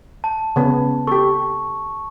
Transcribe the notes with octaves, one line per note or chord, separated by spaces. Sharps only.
A5
C#3 B3
G4 A4 C#6